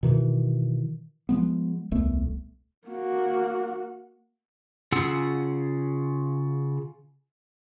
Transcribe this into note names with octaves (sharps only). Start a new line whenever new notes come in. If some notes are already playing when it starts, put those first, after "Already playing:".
B2 D#3 E3
F3 G#3 B3
D#1 C2 A3 B3
A#3 F#4
C#3 F4 G#4 F#5 E6